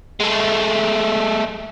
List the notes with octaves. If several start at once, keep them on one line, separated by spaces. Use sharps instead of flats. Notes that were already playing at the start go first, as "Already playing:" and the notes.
G#3 A3